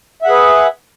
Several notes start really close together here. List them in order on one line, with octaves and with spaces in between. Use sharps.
E5 F#5 G#4 B4